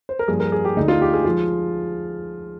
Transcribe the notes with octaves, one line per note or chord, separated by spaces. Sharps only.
C5
A#4
G2 F3 A#3 G#4
A#4
G#4
G4
D2 D3 G#3 D#4
F4
G4
G#4
F3 G#3 F4